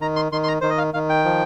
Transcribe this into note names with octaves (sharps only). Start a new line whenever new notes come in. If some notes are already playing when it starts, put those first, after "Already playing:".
D#3 A#5
C6
D#3 C6
C6
A#5
D#3 C5
D#5
F5
D#3 F5
G5
F3